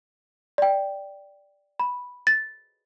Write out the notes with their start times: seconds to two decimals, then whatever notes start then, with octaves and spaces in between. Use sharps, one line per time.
0.58 D5 G5
1.80 B5
2.27 A6